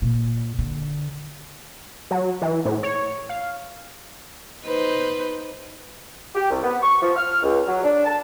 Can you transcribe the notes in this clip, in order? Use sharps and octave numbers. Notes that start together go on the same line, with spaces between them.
A#2
D3
F#3
E3
A2
C#5
F5
D#4 B4 C5
G4
C2
B3
C#6
F3
F6
C#2
F#3
D4
A5